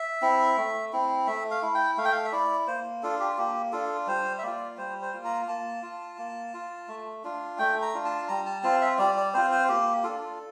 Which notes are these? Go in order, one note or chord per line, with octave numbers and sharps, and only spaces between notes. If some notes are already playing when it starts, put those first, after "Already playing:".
Already playing: E5
C4 E4
A3
C4 E4
A3 E5
F5
E4
G5
A3 F5
G5
F5
E5
E4 D5
A#3 C5
D4 F4 A4
G4
A#3 G4
D4 F4 A4
G3 C5
E5
A#3 F4 D5
G3 C5
C5
A#3 F4
A#5
A#3 A5
F4
A#3
F4
A3
D4 F4
A3 G5
A#5
D4 F4
A5
G3 A#5
A5
C4 F4 A5
E5
G3 D5
D5
C4 F4 C5
C5
A#3 G4
D4 F4 A4